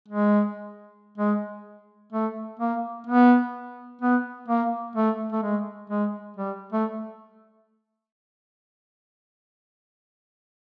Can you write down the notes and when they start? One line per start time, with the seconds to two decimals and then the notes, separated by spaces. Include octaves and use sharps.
0.08 G#3
1.18 G#3
2.12 A3
2.59 A#3
3.07 B3
4.02 B3
4.48 A#3
4.96 A3
5.32 A3
5.43 G#3
5.90 G#3
6.37 G3
6.72 A3